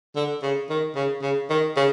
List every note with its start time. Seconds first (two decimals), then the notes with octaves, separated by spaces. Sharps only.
0.16 D3
0.43 C#3
0.70 D#3
0.96 C#3
1.22 C#3
1.50 D#3
1.76 C#3